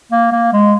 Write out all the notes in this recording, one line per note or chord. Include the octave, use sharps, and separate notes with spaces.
A#3
A#3
G#3